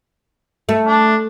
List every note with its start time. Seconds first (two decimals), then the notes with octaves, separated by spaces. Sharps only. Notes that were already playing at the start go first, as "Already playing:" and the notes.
0.69 A3
0.86 D4